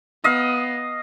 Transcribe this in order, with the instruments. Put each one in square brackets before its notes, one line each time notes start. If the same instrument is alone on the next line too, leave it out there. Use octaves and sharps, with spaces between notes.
[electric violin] B3 [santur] D#5 F5